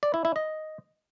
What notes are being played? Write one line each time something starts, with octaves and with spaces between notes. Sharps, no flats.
D5
E4
E4
D#5